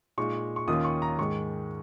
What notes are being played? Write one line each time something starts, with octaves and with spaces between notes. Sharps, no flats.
A#2 G#3 D#4 C#6
C#6
D#2 D#3 C#4 F4 D#6
C#6
A#5
G#2 D#3 G#3 C#6